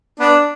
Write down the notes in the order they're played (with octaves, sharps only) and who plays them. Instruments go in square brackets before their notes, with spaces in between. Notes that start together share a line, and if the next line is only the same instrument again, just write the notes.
[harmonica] B3 D4